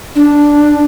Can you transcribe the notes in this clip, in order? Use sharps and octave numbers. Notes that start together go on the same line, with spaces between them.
D4